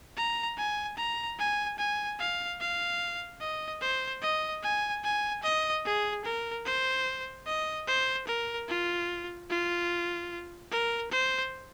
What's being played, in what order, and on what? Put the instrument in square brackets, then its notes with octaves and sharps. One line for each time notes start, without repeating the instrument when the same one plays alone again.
[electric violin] A#5
G#5
A#5
G#5
G#5
F5
F5
D#5
C5
D#5
G#5
G#5
D#5
G#4
A#4
C5
D#5
C5
A#4
F4
F4
A#4
C5